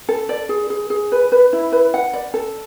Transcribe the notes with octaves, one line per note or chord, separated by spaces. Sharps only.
A4
D5
G#4
G#4
G#4
B4
B4
E4
B4
F#5
D5
A4